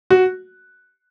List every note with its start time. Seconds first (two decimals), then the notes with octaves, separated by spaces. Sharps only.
0.10 F#4